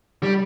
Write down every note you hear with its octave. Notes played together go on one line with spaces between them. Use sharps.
G3